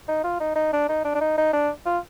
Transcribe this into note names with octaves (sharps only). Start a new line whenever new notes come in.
D#4
F4
D#4
D#4
D4
D#4
D4
D4
D#4
D#4
D4
F4